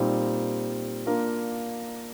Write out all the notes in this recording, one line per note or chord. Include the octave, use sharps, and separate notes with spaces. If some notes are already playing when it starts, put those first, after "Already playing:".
Already playing: A#2 G3 C4 D#4
A#3 D4 F4 A#4